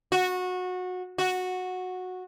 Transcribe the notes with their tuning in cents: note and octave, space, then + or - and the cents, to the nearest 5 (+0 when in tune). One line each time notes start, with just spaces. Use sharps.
F#4 -20
F#4 -10